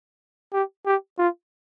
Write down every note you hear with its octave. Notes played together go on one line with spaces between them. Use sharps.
G4
G4
F4